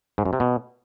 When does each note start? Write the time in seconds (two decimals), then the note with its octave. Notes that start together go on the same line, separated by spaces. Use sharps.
0.18 G#2
0.25 F#2
0.33 C3
0.40 B2